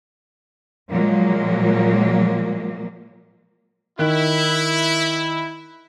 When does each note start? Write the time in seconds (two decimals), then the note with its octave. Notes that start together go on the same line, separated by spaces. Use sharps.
0.90 A#2 F3 F#3 G#3 A#3
3.99 D#3 E4 F#6